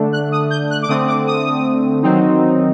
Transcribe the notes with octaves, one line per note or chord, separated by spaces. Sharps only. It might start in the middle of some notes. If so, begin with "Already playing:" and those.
Already playing: D3 A3 D4
F#6
D#6
G6
F#6
D6
D3 A3 C4 D#6
D6
D#6
D#3 F#3 C4 D#4